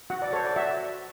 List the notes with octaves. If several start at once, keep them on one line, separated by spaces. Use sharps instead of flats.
F#4 F#5
D5
A4 C5 C#5
D5
F#4 E5